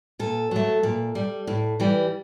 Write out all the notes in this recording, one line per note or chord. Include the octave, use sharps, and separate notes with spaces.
A#2 A4
F#3 A3
A#2
G3
A2
E3 G3